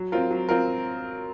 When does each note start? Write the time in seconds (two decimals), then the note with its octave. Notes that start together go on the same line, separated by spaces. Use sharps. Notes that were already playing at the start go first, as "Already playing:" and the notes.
Already playing: F#3
0.12 C4 F4 A#4
0.31 F#3
0.49 C4 F4 A#4